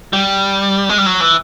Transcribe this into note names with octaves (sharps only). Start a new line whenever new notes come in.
G3
G#3
G3
F#3
E3